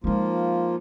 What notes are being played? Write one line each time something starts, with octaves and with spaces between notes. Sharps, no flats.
F3 G#3 A#3 D#4 F4